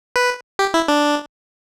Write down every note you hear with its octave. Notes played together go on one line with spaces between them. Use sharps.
B4
G4
E4
D4